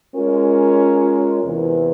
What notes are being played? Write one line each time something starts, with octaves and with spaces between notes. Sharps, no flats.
G#3 C#4 F4 A#4
E2 C3 E3